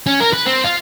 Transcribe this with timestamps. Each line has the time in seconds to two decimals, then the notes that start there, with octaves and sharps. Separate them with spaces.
0.06 C#4
0.20 A#4
0.33 B4
0.46 C4
0.64 F4